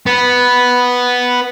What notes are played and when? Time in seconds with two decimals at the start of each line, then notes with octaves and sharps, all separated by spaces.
0.06 B3